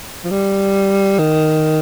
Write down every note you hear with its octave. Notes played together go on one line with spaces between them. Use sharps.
F3
G3
D#3